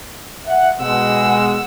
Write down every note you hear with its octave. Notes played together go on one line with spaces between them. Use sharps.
E5 F#5
B2 G#3 F#5 E6